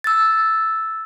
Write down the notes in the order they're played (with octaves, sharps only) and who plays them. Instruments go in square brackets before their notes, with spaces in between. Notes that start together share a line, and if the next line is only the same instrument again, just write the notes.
[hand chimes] E6 A6